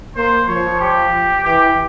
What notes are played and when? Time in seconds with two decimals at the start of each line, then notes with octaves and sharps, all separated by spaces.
0.16 A#3 C5
0.48 F3 C#5
0.80 G4
1.44 E3 G4